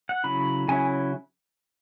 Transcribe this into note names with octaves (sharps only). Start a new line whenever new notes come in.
F#5
C#3 F#3 C#4 E4 B5
C#3 F#3 C#4 E4 G#5